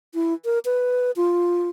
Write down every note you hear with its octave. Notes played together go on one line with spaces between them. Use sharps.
E4
A#4
B4
F4